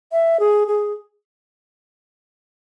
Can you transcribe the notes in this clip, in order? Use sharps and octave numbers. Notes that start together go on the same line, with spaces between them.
E5
G#4
G#4